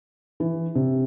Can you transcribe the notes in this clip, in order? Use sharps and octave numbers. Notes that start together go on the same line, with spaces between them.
E3
C3